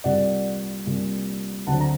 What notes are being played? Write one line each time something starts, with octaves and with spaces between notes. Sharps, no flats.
C2 A#2 G3 A#3 D5 F#5
C2 A#2 G3 A#3
D2 D3 F#3 C4 F#5 A5
A#5